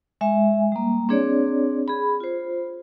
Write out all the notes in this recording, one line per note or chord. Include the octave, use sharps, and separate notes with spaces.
G#3 E5 G#5
G3 A#3
C4 D4 G#4 C#5 D5
G#4 B5
F4 C5